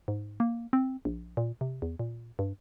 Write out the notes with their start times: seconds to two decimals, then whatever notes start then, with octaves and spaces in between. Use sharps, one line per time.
0.08 G#2
0.40 A#3
0.73 C4
1.05 A#1
1.37 A#2
1.61 C3
1.82 E2
1.99 A#2
2.39 G2